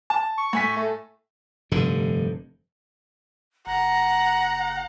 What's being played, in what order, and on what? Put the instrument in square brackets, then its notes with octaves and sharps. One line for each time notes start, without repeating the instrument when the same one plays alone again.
[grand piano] A5
[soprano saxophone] C#6
[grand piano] A2 G#5 B6
[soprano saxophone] A3
[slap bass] F1 G2 D3
[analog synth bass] F#1 [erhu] F#5 [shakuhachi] A#5